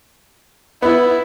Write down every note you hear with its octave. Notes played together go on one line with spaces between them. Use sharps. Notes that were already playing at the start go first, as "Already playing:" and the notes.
B3 E4